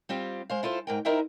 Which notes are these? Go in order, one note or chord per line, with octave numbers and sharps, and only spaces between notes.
G3 C4 F4 G4
G#3 C5 F5
E4 F4 A4 C5
G#2 A#4 G5
D#4 E4 A#4 C5 E5 G5